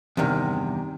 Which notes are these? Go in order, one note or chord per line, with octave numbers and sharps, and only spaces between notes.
E2 G2 C3 D#3